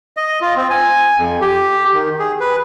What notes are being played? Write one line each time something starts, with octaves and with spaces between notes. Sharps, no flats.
D#5
F4
C4
G#5
F2
G4
D#3
G#4
B4